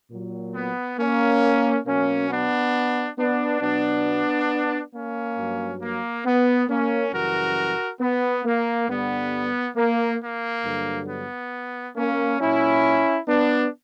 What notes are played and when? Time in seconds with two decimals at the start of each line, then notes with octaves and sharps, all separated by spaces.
0.11 A#2 F#3
0.55 B3
0.99 A#3 C#4
1.86 B2 F#3 A#3 C#4
2.30 B3 D4
3.18 B3 D4
3.62 B2 F#3 B3 D4
4.94 A#3 C#4
5.37 G2 F#3
5.82 A#3
6.25 B3
6.69 A#3 C#4
7.13 F#2 C#3 E3 G3 F#4 A#4
8.01 B3
8.45 A#3
8.89 G2 D3 G3 B3
9.77 A#3
10.20 A#3
10.64 G2 D3 F#3
11.08 B3
11.96 A#3 C#4
12.40 A#2 F#3 C#4 E4
13.28 B3 D4